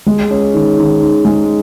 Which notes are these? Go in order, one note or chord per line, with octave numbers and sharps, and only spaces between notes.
G#3
C#4
D#3
D#3
D#3
G#3